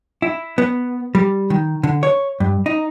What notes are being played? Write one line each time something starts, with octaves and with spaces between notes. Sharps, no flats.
E4
B3
G3
D#3
D3
C#5
G2
D#4